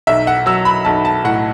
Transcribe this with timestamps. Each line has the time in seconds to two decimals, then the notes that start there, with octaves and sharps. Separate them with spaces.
0.07 B1 E5
0.27 F#5
0.46 F#3 E6
0.65 B5
0.85 B1 A5
1.05 A5
1.24 A2 F#5